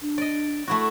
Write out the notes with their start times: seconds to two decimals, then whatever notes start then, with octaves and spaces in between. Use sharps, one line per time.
0.02 D4
0.18 D5 D#5
0.68 A3 E4 F#4